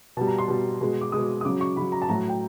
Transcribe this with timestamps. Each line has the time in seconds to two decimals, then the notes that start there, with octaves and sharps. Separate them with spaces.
0.17 B2 G3 A5
0.27 A#5
0.38 C6
0.48 B2 G3
0.81 B2 G#3
1.01 D6
1.12 B2 G#3 D#6
1.41 D#6
1.44 C#3 F#3 D6
1.61 C#6
1.77 C#3 F#3 B5
1.92 A#5
2.02 A5
2.09 A2 F#3 A#5
2.29 G5